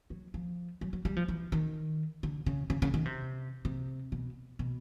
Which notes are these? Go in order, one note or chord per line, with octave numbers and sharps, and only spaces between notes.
F#3
F3
F#3
F#3
G3
F3
E3
D#3
D3
C#3
C#3
C#3
D#3
C3
C3
B2
B2